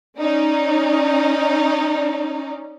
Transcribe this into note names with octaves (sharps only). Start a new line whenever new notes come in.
C#4 D#4 D5